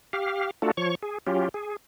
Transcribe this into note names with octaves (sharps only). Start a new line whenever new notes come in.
G4 F5
A3 D4 F4 F#4 A4
F3 C#5 C#6
G#4
F#3 C#4 F4 G4
G#4